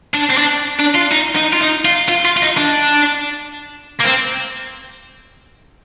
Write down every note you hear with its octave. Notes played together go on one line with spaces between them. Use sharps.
D4
C4
D4
D4
F4
D#4
D#4
F4
D#4
F4
F4
F4
F4
D#4
D4
A#3
C4